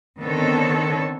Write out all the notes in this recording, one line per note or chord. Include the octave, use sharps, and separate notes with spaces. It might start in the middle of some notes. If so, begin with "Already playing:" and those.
D3 D#3 B3 C4 A4 C#5